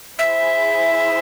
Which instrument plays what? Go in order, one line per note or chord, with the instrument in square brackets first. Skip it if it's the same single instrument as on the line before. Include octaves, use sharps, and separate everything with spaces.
[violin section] E4 G#4 C5 [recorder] E5